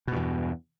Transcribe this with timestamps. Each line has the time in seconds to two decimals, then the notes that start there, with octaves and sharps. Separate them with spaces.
0.07 B2
0.12 G2
0.16 E2